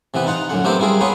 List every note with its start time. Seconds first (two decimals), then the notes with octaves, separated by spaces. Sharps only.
0.14 C3 E3 B3 B4
0.26 D#4 F4 F#5 A#5
0.49 F#2 A#2 D3 F#5
0.64 A3 B3 C4 D4 G4 A#4
0.79 G3 E4 F4 G#4 A#4
1.01 A#3 B3 F4 G#4 B4 C#5